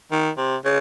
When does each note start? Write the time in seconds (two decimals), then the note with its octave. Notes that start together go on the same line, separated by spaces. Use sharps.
0.11 D#3
0.37 C3
0.64 C#3